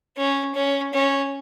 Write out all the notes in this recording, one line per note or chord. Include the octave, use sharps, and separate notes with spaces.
C#4
C#4
C#4